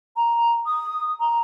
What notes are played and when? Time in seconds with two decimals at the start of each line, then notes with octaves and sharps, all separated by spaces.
0.17 A#5
0.66 D#6
1.20 A#5